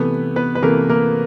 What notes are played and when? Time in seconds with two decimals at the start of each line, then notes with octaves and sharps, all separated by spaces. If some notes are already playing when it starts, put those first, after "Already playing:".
Already playing: C3 E3 A3 B3 B4
0.36 B3 B4
0.55 B4
0.62 C3 E3 A3 A#3 A#4
0.89 A#3 A#4